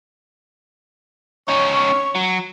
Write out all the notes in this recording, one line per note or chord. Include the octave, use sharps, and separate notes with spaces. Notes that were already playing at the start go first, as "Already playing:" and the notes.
C#4 D#4 C#5
F#3